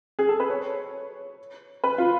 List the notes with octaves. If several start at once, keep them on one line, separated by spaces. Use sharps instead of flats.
G#4
A4
B4
C#5
B4
F4